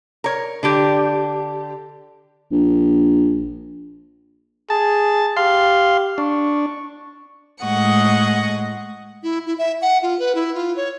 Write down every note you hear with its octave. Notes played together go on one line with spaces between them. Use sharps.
A#4 C#5
D3 D4 G4
A#1
G#4 A5
G4 F5 C6
D4 C#6
A2 G#3 D#5 F#5 C#6
E4
E4
E5
F#5
F4
B4
E4
F4
C#5